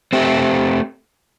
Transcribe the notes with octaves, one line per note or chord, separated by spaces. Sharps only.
A3 C4 G4